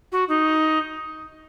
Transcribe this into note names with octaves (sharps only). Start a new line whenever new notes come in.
F#4
D#4